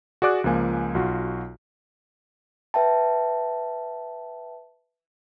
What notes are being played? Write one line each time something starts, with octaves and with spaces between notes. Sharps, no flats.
F#4 G#4 D5 D6 F#6
C#2 F3 A#3 G#5
B1 F4 F#4
B4 E5 G5 A5